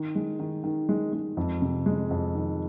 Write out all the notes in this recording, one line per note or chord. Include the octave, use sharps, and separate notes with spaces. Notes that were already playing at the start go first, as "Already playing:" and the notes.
Already playing: D#3
G#3
D#3
D#3
G#3
G#3
F2
C3
G#3
F2
D#3